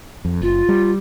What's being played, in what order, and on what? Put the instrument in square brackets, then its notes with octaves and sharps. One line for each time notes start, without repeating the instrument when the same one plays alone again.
[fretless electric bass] F2
[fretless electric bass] F#1 [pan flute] F4
[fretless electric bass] G3